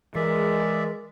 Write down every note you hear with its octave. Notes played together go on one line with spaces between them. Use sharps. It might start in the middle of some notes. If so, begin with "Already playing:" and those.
E3 G#3 A#4 D5 E5